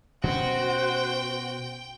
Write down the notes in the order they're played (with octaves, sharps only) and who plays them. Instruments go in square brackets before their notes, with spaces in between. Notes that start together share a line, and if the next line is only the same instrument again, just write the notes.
[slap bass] B2 C4 C#4 [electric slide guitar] F#4 [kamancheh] C5 [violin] G5